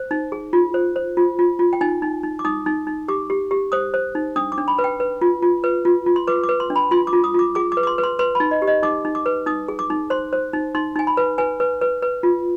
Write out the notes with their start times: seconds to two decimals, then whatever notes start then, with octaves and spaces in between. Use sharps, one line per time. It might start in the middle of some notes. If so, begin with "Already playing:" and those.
Already playing: C5
0.11 D#4
0.32 G#4
0.53 F4
0.74 C5
0.96 C5
1.17 F4
1.39 F4
1.59 F4
1.73 G5
1.81 D#4 G#5
2.02 D#4
2.23 D#4
2.39 D6
2.45 D#4 D#6
2.66 D#4
2.87 D#4
3.08 G4 D6
3.30 G4
3.51 G4
3.72 C5 D#6
3.94 C5
4.15 D#4
4.36 D4 D#6
4.52 D6
4.58 D4
4.68 B5
4.79 B4
4.84 G5
5.00 B4
5.21 F4
5.42 F4
5.64 B4
5.85 F4
6.06 F4
6.16 C6
6.27 B4 D6
6.44 D6
6.49 B4
6.60 C6
6.70 D4
6.76 B5
6.91 F4 C6
7.07 D6
7.13 F4
7.24 D#6
7.34 F4 D6
7.55 G#4 D6
7.72 D6
7.77 B4
7.83 D6
7.87 C6
7.98 B4
8.04 C6
8.19 B4 C6
8.35 D#4 B5
8.51 D#5
8.62 G4
8.67 D#5
8.83 D#4 D6
9.05 D#4
9.15 D6
9.26 B4
9.46 D#4 D#6
9.68 G#4
9.79 D6
9.90 D#4
10.10 C5 C6
10.33 C5
10.53 D#4
10.75 D#4 C6
10.96 D#4 G#5
11.07 B5
11.17 B4
11.38 B4 G#5
11.60 B4
11.81 B4
12.02 B4
12.23 F4